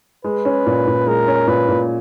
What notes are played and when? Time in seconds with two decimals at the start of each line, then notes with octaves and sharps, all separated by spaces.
0.24 G#3 B4
0.45 C#4
0.66 A#2
0.87 A#2
1.07 G#3 A#4
1.28 C#4
1.47 A#2 B4
1.68 A#2